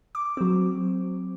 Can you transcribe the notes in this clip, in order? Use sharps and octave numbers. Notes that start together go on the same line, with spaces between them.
D6
F#3 C4